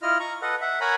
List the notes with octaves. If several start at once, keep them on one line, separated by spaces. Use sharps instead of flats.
E4 F4 D#5 F6
A#5 C#6
A4 B4 D#5 F#5
E5 F#5
A#4 C#5 F#5 G#5 A#5 B5